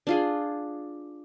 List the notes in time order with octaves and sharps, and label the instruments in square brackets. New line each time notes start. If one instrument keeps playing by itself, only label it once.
[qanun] D4 F4 G#4